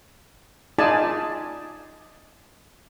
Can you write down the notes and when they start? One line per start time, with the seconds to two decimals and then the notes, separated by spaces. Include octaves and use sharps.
0.78 D#4 F4 G#4 D5 G#5 A5